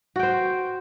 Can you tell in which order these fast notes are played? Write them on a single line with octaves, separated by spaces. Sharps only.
F#4 G5 C5